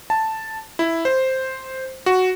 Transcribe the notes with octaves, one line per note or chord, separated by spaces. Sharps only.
A5
E4
C5
F#4